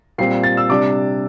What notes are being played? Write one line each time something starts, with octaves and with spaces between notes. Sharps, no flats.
A#2 G3 C4 C7
A6
E6
C3 G3 D4 D6